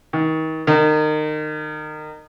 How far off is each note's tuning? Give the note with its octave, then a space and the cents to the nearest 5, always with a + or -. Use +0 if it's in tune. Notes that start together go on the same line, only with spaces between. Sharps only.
D#3 +35
D#3 -25